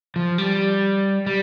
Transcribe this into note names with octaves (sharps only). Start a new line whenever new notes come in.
F3
G3
G3